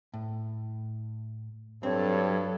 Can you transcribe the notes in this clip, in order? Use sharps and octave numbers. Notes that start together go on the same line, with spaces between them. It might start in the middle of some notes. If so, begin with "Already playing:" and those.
A2
G2 F#3 C4 A4 C#5